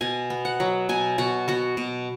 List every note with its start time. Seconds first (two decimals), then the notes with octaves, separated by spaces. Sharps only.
0.01 B2 G#5
0.30 B3
0.45 F#5
0.60 F#3
0.89 B2 G#5
1.18 B2 F#4
1.48 B3 F#4
1.77 B2